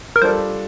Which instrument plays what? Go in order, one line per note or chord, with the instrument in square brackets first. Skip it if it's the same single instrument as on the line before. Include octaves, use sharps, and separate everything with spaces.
[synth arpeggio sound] A#4
[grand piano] G3 D4 F4 A4 D5 [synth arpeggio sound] C5